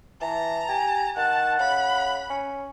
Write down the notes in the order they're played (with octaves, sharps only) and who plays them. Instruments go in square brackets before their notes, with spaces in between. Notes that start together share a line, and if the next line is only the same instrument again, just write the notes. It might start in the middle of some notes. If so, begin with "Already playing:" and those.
[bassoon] E3 [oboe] A5 [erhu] A#5
[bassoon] G4 [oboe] G#5
[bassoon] D#3 [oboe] F#5 [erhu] A5
[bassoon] C#3 [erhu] B5
[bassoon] C#4